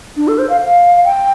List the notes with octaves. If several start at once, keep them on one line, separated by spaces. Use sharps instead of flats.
D4
A4
C5
F5
F5
G5